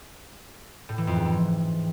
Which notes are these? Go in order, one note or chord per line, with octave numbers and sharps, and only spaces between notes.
A2
E3
F2
G#2
E3